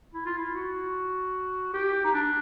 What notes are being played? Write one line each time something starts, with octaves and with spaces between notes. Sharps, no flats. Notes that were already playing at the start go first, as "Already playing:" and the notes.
E4
F4
E4
F#4
G4
D#4
D4